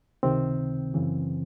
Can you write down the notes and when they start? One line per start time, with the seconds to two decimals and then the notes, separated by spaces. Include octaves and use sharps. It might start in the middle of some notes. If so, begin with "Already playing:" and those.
0.23 C#2 C3 D#3 C4
0.94 F#2 C#3 E3